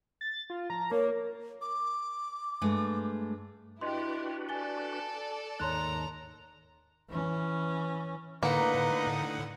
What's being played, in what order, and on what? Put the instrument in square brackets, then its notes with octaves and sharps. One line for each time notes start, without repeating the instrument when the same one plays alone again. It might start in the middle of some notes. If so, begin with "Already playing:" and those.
[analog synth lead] A6
F4
[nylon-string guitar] F3 [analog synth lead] A#5
[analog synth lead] A#3 [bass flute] A#4 [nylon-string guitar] C#5
[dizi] D6
[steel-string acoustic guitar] G2 G#3 A3
[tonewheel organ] D4 F#4 B4 [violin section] E4 G4 [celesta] D#5 C6
[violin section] A4 D5 [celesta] G#5 A6 G7
[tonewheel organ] D#2 G#2 D#3 [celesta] C#5 C6 F#6 [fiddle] A#5
[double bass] E3 C#4
[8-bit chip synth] A2 D3 F#5 [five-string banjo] A#3 [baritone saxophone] D#4 [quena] B4